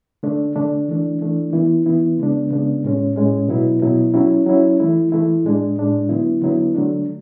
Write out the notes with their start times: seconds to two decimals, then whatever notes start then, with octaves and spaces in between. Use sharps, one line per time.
0.23 D3 A3 D4
0.55 D3 A3 D4
0.88 E3 A3 D4
1.21 E3 A3 D4
1.53 E3 B3 E4
1.86 E3 B3 E4
2.18 C#3 G#3 B3 D4
2.51 C#3 G#3 B3 D4
2.84 A2 G#3 C#4
3.16 A2 G#3 C#4
3.48 B2 F#3 B3 E4
3.82 B2 F#3 B3 E4
4.14 F#3 C#4 E4
4.47 F#3 C#4 E4
4.80 E3 A3 E4
5.12 E3 A3 E4
5.45 A2 G#3 D4
5.78 A2 G#3 D4
6.09 D3 F#3 B3 E4
6.42 D3 F#3 B3 E4
6.74 D3 F#3 A3 D4